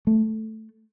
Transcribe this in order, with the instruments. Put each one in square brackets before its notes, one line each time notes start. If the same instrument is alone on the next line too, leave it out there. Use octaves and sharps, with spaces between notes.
[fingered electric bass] A3